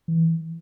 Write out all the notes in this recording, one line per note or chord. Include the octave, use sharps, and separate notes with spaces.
E3